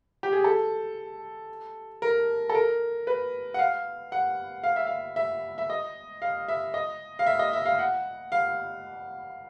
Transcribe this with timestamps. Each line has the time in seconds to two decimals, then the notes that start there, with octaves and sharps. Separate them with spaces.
0.23 G4
0.33 G#4
0.44 A4
2.02 A#4
2.50 A4
2.55 A#4
3.07 B4
3.54 F#5
3.59 F5
4.12 F#5
4.64 F5
4.76 E5
4.86 F5
5.16 E5
5.58 E5
5.70 D#5
6.22 F5
6.48 E5
6.74 D#5
7.19 F5
7.26 E5
7.39 D#5
7.53 E5
7.66 F5
7.79 F#5
8.32 F5